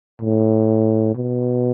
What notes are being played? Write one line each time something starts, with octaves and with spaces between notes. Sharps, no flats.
A2
B2